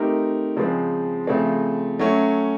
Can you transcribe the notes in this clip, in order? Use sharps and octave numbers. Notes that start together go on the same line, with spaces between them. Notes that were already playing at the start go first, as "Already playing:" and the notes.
Already playing: A3 C4 D#4 G4 A#4
C#3 F3 G#3 C4
C#3 F3 A3 C4
F#3 A3 C#4